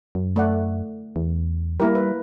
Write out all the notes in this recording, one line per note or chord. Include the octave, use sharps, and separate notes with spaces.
F#2
A3 D5 F#5
E2
G3 A#3 E4 A#4
B4